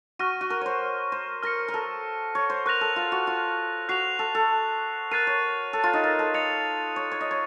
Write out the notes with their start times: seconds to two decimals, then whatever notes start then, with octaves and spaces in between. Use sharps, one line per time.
0.19 F#4 C#6 F6 A#6 D#7
0.41 F#4
0.50 A#4
0.61 C5 C#5
1.12 C5
1.43 A#4 F6 A#6 C#7
1.68 A#4
1.74 A4
2.35 C#5
2.50 C5
2.66 A#4 C#6 F#6 A#6 F7
2.81 A4
2.96 F4
3.12 F#4
3.27 F4
3.89 F#4 F#6 C7 F7
4.19 A4
4.35 A4
5.11 A#4 F#6 A6 C7 D#7
5.27 C#5
5.73 A4
5.84 F4
5.93 D#4
6.04 A#4
6.19 A4
6.34 D#5 A6 C#7 F7
6.96 C#5
7.11 C#5
7.21 D#5
7.31 C#5